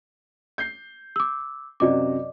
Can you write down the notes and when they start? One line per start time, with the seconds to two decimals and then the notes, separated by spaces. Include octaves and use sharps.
0.58 G6 C7
1.16 D6 E6
1.80 F#2 C3 F#4 D5 D#5 D6